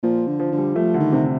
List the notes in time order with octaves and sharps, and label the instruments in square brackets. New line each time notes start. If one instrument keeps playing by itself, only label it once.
[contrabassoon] A#2 [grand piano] F3
[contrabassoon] D3
[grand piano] F3
[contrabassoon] D3
[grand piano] G3
[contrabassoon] F3 [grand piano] A3
[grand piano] D3
[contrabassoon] D#3
[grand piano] C3